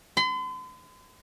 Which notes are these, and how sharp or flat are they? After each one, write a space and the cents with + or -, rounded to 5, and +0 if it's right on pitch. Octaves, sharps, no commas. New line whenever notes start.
C6 -45